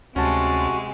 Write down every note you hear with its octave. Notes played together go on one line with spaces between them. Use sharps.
D2 C3 G#3 C#4 F#4 A5